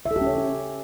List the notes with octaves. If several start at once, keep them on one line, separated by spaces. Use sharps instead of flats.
E5
A4
G4
C#4
C#5